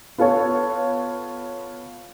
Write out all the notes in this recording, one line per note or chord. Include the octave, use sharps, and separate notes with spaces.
B3 F4 A4 C#5